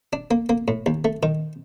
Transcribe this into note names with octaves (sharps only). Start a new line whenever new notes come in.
D4
A#3
A#3
A2
D#2
A3
D#3